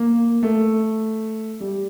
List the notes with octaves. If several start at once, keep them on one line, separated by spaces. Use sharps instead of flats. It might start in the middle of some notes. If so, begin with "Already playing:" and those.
Already playing: A#3
A3
G3